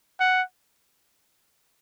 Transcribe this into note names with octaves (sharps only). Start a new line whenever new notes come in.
F#5